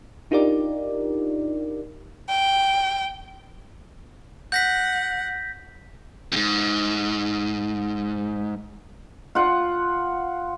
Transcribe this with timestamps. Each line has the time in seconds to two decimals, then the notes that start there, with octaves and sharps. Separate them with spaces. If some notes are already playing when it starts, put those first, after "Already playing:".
0.31 D4 D#4 F4 G4 A#4 D5
2.29 G5
4.52 F#5 G6 A#6 B6
6.32 F2 G#2
9.35 F4 F#5